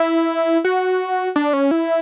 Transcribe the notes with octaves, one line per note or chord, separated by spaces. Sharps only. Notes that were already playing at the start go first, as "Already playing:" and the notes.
Already playing: E4
F#4
D4
C#4
E4